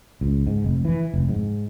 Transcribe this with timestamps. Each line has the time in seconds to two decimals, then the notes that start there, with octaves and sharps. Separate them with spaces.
0.21 C#2
0.47 G#2
0.64 F1
0.85 E3
1.14 F1
1.29 G#2